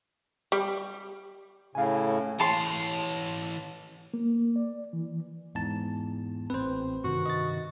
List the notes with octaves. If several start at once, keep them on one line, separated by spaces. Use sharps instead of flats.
G3
A2 C#3 F5 G#5
E3 C#5 A5 C6
A#3
D5
E3
E2 G#2 A5
A1 C4 B4 C5
G2 C3 D#3 F#4
D#5 A6